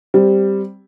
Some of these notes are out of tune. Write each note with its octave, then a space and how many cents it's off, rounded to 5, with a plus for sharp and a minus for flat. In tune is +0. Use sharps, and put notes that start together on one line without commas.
G3 +0 C4 +0